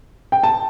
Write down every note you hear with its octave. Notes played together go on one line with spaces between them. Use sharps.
G5
A5